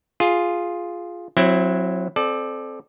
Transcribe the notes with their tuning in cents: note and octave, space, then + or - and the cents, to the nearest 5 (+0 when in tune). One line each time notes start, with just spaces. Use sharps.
F4 +0 G#4 +0
F#3 -20 C4 +10 E4 +10
C4 +0 A4 -25 D5 +20